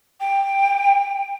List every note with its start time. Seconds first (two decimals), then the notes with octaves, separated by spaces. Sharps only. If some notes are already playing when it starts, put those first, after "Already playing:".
0.20 G5